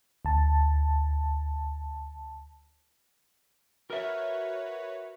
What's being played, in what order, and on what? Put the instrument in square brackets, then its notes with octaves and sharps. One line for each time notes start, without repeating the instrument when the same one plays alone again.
[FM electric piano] D2 A5
[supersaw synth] F#4 B4 C#5 [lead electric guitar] A#4 E5